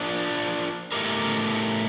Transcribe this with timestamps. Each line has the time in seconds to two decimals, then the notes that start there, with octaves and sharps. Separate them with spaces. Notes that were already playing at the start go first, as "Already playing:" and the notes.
Already playing: F3 A#3 D4
0.92 A2 A3 D#4 G4 A#4